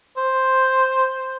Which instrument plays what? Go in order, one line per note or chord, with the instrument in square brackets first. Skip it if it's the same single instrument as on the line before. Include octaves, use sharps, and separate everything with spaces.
[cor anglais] C5